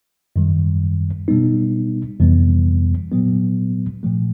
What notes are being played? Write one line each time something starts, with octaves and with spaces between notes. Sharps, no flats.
F#2 D#3 G3
B2 G3 B3 D#4
F2 C3 E3 G3 B3
A#2 F#3 B3
A#2 F3 A3